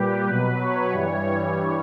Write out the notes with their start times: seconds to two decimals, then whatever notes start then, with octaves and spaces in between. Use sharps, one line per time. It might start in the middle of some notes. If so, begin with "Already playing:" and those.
Already playing: A#2 G3 G4 B4
0.27 B2 F#3 B4
0.60 C#5
0.92 G2 E3 G3